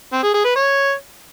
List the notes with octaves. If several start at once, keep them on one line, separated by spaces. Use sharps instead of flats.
C4
G#4
G#4
B4
C#5